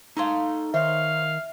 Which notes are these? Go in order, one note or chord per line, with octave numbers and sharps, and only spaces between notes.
A3 D#4 A4 F5 C6
D#3 D#4 C5 C#5 E5 F5